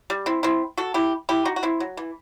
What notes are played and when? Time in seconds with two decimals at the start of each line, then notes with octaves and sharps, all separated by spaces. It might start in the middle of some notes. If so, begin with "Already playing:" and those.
0.10 G3
0.26 C4 E4
0.43 C4 E4
0.78 F#4 A4
0.94 E4 G4
1.29 E4 G4
1.45 D#4 F#4
1.56 F#4
1.63 C4 E4
1.80 F#3
1.97 E3